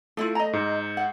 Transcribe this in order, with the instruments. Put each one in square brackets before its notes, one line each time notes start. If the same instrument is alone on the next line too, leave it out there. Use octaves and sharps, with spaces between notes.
[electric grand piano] A3 [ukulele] D4 E4 F4
[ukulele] D#5 A#5
[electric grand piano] G#2
[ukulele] F#5